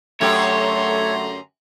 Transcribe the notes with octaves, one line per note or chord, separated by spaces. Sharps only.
F#2 D3 A3 G4 C#5 A#5 C6